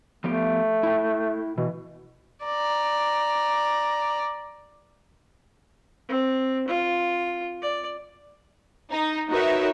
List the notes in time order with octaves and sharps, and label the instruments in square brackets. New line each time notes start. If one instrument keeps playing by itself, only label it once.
[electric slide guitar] F3 B3 G4 [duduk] A3
[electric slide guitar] E4 G5
[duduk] B2 [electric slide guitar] E3
[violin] D5 A#5
[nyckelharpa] C4
F4
D5
[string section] D#4
D#4 F#4 A#4 B4 C#5 E5